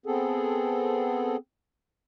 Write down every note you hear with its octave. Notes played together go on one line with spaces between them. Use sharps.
B3 C4 G#4 A4